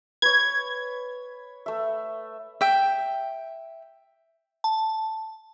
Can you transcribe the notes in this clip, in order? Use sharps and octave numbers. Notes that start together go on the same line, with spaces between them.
B4 C#5 G#6
A3 E5
E5 G5
A5